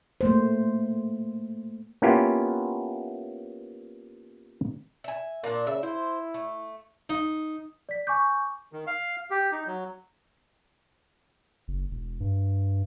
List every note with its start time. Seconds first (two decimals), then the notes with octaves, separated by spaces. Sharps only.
0.21 A3 A#3 C5
2.02 A#3 B3 C#4 E4 F4 G4
5.04 E5 G#5
5.44 A#2 A#3 D4
5.67 C#3 E5
5.83 E4 C5
6.34 A3
7.10 D#4
7.89 D5 B6
8.07 G#5 C#6 D6 G6
8.73 D#3
8.87 F5
9.30 G4
9.52 D#4
9.67 F#3
11.68 F#1
11.91 E1
12.20 G2